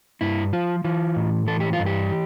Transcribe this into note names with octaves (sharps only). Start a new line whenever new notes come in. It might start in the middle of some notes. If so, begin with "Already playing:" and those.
G2 E4
F3 F4
E3 F4
A2
E3 A4
G4
F4
G2
G4